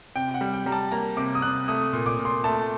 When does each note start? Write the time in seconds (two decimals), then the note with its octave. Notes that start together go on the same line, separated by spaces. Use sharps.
0.16 C3 G5
0.34 F#5
0.41 G3
0.54 G5
0.66 G3 A#5
0.72 A5
0.92 A#3 A#5
1.17 C3 D6
1.35 D#6
1.42 C3 F#6
1.68 A3 D#6
1.93 A#2
2.06 D6
2.19 A#2
2.25 C6
2.44 A3 A5